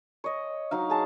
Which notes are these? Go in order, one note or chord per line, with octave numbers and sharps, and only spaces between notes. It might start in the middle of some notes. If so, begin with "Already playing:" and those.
C#5 D#5
F#3 D#4 F5
G#4 A5